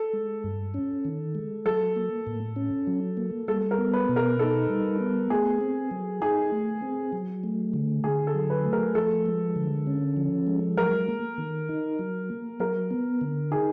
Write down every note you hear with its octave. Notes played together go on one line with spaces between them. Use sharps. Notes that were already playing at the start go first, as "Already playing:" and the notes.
Already playing: A4
G#3
G2
C#4
D#3
G#3
F#3 A4
A#3
A2
C#4
F#3
A#3
G3 A4
A#4
B3
B4
B2
A#4
D#4 A4
G3
B3
A3 G#4
C4
F#3
D#4 G#4
A3
C4
F#3
A3
D3
D3 G#4
A4
F#3
B4
A3
A#4
F3 A4
G#3
D3
C#4
F3
G#3
F#3 A#4
A#3
D#3
D#4
F#3
A#3
F#3 A#4
B3
D3
D#4 G#4